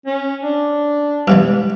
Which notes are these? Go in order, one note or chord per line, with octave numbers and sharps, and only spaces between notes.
C#4
D4
G2 B2 E3 G#3 G4